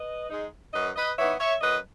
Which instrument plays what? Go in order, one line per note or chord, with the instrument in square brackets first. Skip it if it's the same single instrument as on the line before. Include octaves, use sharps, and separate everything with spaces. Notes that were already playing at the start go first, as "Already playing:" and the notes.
Already playing: [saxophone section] B4 D#5
G#3 D#4
F#2 B4 D#5
B4 D#5
E3 B3 D#4 C#5 E5
C#5 E5
F#2 B4 D#5